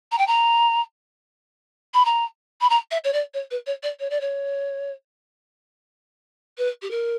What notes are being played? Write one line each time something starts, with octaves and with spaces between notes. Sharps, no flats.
A#5
G5
A#5
B5
A#5
B5
A#5
E5
C#5
D5
C#5
B4
C#5
D5
C#5
D5
C#5
B4
G4
A#4